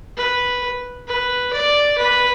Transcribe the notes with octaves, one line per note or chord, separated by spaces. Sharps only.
B4
B4
D5
B4